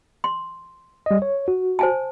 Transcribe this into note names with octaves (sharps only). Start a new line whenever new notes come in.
C6
G3 D#5
C#5
F#4
C5 G#5 A5